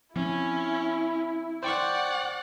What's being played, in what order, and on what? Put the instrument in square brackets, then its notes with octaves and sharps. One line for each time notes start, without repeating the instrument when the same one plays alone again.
[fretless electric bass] F3 C4 [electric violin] C#4 [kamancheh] E4
[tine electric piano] C5 G5 C#6 [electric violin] D5 F#5